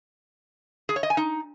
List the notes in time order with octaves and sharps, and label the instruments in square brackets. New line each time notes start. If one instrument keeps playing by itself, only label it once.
[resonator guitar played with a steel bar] G#4
C#5
D#5
G#5
D#4